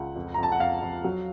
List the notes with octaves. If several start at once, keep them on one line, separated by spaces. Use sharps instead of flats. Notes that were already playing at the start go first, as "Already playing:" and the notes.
Already playing: C#2 F#5
F2
A#5
F2
A5
F#5
F2 F5
F2
F#3